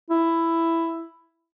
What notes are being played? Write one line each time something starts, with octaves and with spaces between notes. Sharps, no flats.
E4